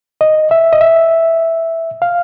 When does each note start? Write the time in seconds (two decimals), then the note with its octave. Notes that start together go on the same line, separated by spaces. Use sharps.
0.21 D#5
0.51 E5
0.73 D#5
0.81 E5
2.02 F5